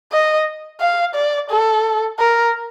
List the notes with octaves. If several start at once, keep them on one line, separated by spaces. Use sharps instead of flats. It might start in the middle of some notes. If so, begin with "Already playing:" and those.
D#5
F5
D5
A4
A#4